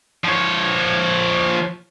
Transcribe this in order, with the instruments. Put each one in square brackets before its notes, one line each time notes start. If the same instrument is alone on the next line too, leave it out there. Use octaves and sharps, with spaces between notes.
[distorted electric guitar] F3 C#5